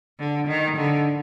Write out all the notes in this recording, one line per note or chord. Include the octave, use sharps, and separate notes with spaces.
D3
D#3
D3